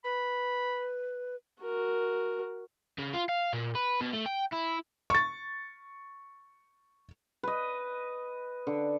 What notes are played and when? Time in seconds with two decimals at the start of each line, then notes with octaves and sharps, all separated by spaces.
0.04 B4 B5
1.63 F#4 A#4
2.99 C#3
3.14 F4
3.29 F5
3.53 A#2
3.75 B4
4.01 B2
4.13 A3
4.26 G5
4.53 E4
5.10 C#6 A6
7.43 B4 D#5
8.67 D3